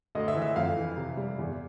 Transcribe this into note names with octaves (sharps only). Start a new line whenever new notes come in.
D2 D#5
E5
E3
E5
F2 F5
E3
C3
G3
E2